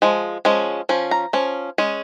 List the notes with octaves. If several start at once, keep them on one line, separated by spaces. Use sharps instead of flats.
F3 G#3
F3 G#3 C#4
F3 C#4
A#5
F3 C#4
G#3 C#4